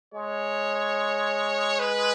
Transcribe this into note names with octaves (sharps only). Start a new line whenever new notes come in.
G#3 C#5
B4